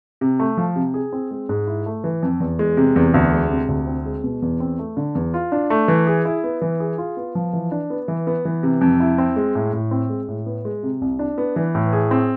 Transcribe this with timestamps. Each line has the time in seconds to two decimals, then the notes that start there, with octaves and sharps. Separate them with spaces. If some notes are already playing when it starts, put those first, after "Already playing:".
0.21 C3
0.39 A3
0.57 F3
0.76 C3
0.94 G#4
1.13 C4
1.31 G#3
1.49 G#2
1.67 E4
1.86 A3
2.04 E3
2.22 F2
2.40 E2
2.59 G#3
2.77 C3
2.96 E2
3.14 D2
3.32 G#3
3.50 C3
3.69 D2
3.87 C4
4.05 G#3
4.24 B2
4.42 E2
4.60 C4
4.79 A3
4.97 D3
5.15 E2
5.34 F4
5.52 D4
5.70 A3
5.88 E3
6.07 G#4
6.25 E4
6.44 B3
6.62 E3
6.80 G#4
6.98 F4
7.17 B3
7.35 F3
7.53 E3
7.72 D4
7.90 B3
8.08 E3
8.27 B3
8.45 E3
8.63 C3
8.81 F2
9.00 E4
9.18 C4
9.36 G#3
9.55 A2
9.73 A2
9.91 C4
10.10 G#3
10.28 A2
10.46 B3
10.65 G#3
10.83 C3
11.01 C2
11.19 D4
11.38 B3
11.56 E3
11.75 A2
11.93 G#4
12.11 C4